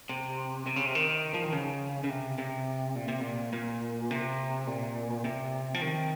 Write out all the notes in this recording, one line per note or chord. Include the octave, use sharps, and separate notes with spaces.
C3
C3
C#3
C3
D#3
F3
D#3
C#3
C#3
C3
C3
A#2
C3
A#2
A#2
C3
A#2
C3
F3
D#3